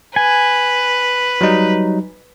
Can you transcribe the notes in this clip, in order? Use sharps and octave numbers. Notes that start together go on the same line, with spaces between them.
B4 G#5
F#3 G3 D#4